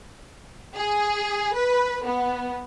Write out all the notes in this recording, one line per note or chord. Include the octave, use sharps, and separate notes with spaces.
G#4
B4
B3